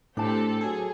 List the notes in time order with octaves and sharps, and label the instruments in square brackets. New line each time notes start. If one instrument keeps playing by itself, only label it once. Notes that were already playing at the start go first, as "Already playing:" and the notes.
[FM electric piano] A2 [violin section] C4 G4 A4 [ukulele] D4 A5
[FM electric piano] F#3 A4 [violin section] G#4